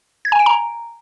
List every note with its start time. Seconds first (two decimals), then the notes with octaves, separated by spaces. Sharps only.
0.25 G#6
0.32 G#5
0.39 D7
0.46 A#5